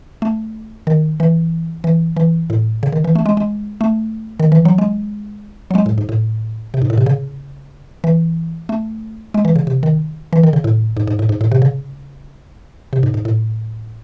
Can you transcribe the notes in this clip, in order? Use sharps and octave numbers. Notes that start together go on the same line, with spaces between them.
A3
D#3
E3
E3
E3
A2
C#3
D#3
E3
A3
G#3
G#3
A3
D#3
E3
F#3
G#3
F#3
G#3
A2
G#2
A2
C3
G#2
A2
C3
C#3
E3
A3
G#3
E3
C#3
C3
D#3
E3
D#3
C#3
A2
G#2
G#2
A2
G#2
A2
C3
C#3
C3
G#2
G#2
A2